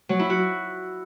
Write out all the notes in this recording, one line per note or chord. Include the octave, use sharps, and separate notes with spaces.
F#3
E4
F#4